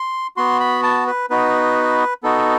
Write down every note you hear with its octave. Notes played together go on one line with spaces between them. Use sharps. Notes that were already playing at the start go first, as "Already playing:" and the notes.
Already playing: C6
B3 F#4 C6
B5
A5
B4
B3 D#4 F#4 B4
B3 D#4 F#4 A4